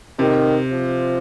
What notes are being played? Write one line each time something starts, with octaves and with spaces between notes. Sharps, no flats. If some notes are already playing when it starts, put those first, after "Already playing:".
C3 D#3
F3